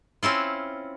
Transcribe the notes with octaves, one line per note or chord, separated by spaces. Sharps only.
C4 C#4 E4 F4